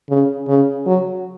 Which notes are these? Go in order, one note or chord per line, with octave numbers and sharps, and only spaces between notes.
C#3
C#3
F#3